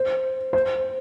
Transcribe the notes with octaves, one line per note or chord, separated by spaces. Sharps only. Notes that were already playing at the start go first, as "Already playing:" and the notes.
Already playing: C5
C5